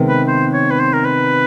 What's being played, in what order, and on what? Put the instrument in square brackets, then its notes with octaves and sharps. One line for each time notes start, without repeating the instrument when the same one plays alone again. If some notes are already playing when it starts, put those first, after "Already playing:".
Already playing: [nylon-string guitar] C3 D#3 G#3 B3
[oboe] B4
C5
C#5
B4
C5
A#4
B4